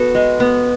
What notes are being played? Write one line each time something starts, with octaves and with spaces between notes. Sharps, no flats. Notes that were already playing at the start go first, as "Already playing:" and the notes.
Already playing: B3 F#4 A4
G#3
B3